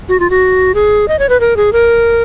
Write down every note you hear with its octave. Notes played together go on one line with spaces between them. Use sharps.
F#4
F4
F#4
G#4
D#5
C#5
B4
A#4
G#4
A#4